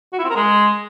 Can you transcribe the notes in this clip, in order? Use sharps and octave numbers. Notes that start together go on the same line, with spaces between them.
F#4
E4
C4
A#4
G#3